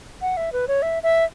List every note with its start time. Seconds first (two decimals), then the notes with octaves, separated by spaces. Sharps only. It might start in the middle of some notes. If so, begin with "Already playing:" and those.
0.21 F#5
0.37 E5
0.53 B4
0.68 C#5
0.82 E5
1.03 E5